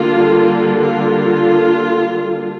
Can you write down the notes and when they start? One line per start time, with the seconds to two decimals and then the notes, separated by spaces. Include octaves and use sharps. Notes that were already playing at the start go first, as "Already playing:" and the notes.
Already playing: D3 G3 A#3 F4
0.78 F4